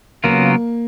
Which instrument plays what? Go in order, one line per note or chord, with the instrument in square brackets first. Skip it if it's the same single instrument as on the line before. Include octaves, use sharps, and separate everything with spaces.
[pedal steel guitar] C#3 F#3 B3 F4 A#4 [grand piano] A#3